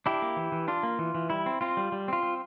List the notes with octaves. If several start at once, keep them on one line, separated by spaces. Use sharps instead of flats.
D4 E4 G4
A#3
E3
E3
D4 F4
A#3
E3
E3
G3 E4
C4
C4 F4
G3
G3
C4 F4
C4